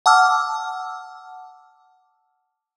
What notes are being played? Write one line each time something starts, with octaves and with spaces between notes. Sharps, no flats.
F#5 A5 D6 E6 F6